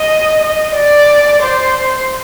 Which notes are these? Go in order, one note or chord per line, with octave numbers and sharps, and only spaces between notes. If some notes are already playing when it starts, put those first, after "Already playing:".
Already playing: D#5
D#5
D5
C5